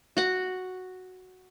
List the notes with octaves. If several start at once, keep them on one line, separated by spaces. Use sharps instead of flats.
F#4 F#5